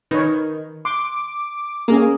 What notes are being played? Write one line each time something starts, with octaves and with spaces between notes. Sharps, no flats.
D#3 B4 C#5
C6 D6
A#3 C#4 G#4 A#4